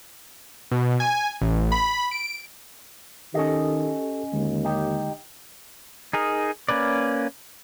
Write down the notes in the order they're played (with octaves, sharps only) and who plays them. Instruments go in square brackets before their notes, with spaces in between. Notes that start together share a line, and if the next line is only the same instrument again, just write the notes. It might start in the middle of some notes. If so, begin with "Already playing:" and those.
[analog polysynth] B2
G#5
A1
B5
D7
[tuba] D#3 [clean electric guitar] C#4 D#5 [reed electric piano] G4 A4
[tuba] D#2 [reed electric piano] D3 G#3
[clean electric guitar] D#4 G4
[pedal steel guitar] D#4 G#4 A#4
A#3 C#4 B4 D5